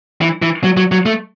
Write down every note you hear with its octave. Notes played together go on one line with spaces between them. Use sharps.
E3
E3
F#3
F#3
F#3
A3